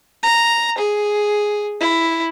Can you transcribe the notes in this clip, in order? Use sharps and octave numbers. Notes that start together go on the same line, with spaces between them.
A#5
G#4
E4